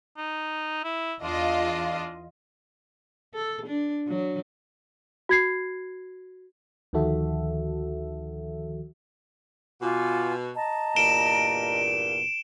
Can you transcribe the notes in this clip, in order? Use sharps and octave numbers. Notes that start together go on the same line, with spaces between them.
D#4
E4
E2 D4 F4 D#5
A4
D4
F#3
F#4 G#6 C7
D2 D#3 F3 F#4 A4 E5
B2 F4 F#4 G#5 D6
D#5 A5 A#5
E2 G2 A#2 D7 E7 G7